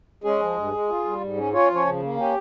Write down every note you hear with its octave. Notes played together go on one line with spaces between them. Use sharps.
G#3 C#4 G#4
F3
G2
G#3
F4
G3
G#2
C#4
C#4 F4 C#5
F3 C#4 C#5
C#3
A#3
C#4 G4